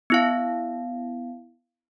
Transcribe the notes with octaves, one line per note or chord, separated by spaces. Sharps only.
B3 E4 F5